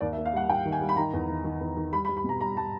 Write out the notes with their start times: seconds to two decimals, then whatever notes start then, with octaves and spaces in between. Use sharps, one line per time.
0.01 D#2 D5
0.13 E5
0.17 A#3
0.26 F5
0.33 G3 F#5
0.49 D#2 G5
0.66 D#3
0.72 G#5
0.81 G3
0.89 B5
0.96 D#3 A#5
1.13 E2
1.29 D#3
1.44 D#3
1.61 E2
1.76 D#3
1.92 G3 B5
2.05 B5
2.09 G3
2.17 B5
2.24 B2 A#5
2.41 G3 A#5
2.57 G3 A5